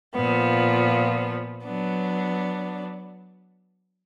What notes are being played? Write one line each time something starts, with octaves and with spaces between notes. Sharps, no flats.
A#2 F3 B3
F#3 B3 D4